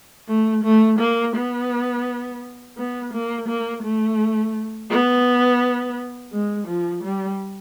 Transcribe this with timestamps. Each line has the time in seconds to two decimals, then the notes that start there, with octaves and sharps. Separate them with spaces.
0.28 A3
0.63 A3
0.99 A#3
1.35 B3
2.77 B3
3.13 A#3
3.48 A#3
3.84 A3
4.91 B3
6.32 G#3
6.68 F3
7.04 G3